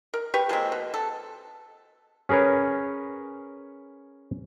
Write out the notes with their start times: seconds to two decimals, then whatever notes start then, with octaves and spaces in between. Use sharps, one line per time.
0.14 A#4
0.34 G4 B4 C#6
0.49 F3 G#3 A#3 C4
0.72 B2
0.94 A4
2.29 C#4 G#4 A#4 B4 C#5